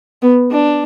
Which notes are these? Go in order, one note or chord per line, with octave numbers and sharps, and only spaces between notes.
B3
D4